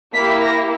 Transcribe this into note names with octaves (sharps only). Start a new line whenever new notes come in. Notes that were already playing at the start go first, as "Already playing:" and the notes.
A#3 E4 G4 B6
A#6